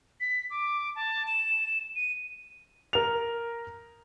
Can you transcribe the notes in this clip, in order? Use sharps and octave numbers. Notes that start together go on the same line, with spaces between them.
B6
D6
A5
E7
D#7
A#4 F7